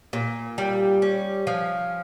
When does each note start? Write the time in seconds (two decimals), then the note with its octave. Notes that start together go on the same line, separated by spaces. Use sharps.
0.13 A#2
0.58 G3
1.02 C#4
1.47 F3